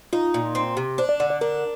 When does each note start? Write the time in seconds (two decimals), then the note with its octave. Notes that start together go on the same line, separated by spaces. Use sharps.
0.13 D#4 F4
0.34 A#2
0.55 C4
0.77 C3
0.98 D4 C5
1.09 D5
1.20 D3 D5
1.30 D5
1.41 D4 A#4